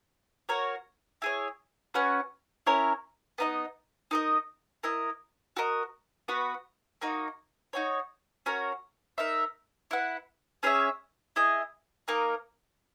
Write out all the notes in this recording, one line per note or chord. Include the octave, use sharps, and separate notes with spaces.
F#4 A#4 C#5
E4 G#4 C#5
C#4 F#4 B4 F#5
C#4 E4 A#4 C#5
B3 D#4 A#4 D#5
D#4 A#4 D#5
E4 A#4 D#5
F#4 A#4 D#5
B3 F#4 B4
A#3 D#4 F#4
D#4 F#4 C#5
C#4 F#4 A#4
D#4 A#4 E5
E4 B4 F#5
C#4 G#4 C#5 E5
E4 G#4 D#5
A#3 D#4 A#4